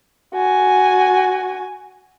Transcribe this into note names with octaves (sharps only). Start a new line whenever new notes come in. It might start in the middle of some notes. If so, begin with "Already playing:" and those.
F#4 G#5